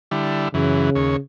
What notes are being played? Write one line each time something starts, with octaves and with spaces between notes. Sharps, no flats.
D3 G3 E4
F#2 C#3 E3
D#2 C#5